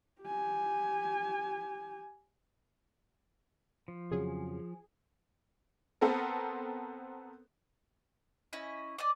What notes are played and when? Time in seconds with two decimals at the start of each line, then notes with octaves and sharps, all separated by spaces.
0.22 G4 G#5
3.88 F3
4.11 F2 C#3 F#3 G#4
6.01 B3 C4 A4 A#4
8.53 C#4 E4 D#5
8.98 D5 D#5 D6